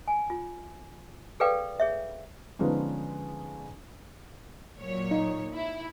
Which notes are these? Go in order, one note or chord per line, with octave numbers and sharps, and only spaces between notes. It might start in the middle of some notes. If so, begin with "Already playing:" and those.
G#5
F4
G#4 A4 B4 D5 F5 G5
G#4 C#5 E5
D3 F3 G#3 B3 C#4 D#4
A#2 F#3 C#5
D#4
E4